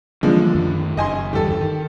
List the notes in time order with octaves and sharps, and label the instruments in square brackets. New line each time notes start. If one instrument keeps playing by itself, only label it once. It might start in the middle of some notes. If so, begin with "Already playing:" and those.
[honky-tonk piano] D3 F3 G#3 [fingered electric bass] E3 G3 A#3
[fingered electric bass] F#2 D#3
[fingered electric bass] F#1 [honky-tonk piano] D#5 G#5 C6
[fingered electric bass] E2 G2 D3 [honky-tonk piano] G4 A4
[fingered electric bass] D#3